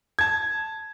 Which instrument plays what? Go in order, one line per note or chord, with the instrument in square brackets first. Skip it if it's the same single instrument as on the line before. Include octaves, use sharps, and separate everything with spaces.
[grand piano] A5 G#6